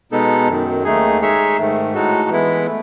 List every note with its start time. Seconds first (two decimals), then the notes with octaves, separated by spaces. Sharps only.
0.12 B2 G#3 B3 D#4 A4
0.48 F#2 D#3 F#3
0.84 D#2 D#3 A3 D#4 G#4
1.20 G#3 D#4 G#4 C#5 E5
1.58 G#2 D#3 A3
1.94 A2 G#3 D#4 F#4 A4
2.30 E3 G#3 B3 E4
2.67 A3